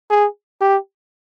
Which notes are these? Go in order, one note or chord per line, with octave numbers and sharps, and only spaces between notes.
G#4
G4